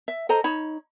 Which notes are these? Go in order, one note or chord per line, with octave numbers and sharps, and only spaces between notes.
E5
A4 C5 D#5 A#5
D#4 C#5 B5